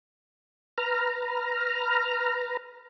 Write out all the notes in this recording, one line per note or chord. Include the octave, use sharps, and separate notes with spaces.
B4 A#5 F6